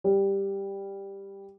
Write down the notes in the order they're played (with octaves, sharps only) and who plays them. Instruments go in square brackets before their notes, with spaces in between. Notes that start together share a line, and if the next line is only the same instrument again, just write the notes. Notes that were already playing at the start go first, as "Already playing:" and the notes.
[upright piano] G3